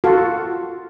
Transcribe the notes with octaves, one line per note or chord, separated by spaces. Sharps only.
F4 F#4 A4